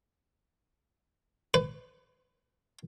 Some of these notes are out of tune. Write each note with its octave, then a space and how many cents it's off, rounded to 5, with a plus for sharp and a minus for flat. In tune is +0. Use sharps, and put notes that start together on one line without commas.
B4 +30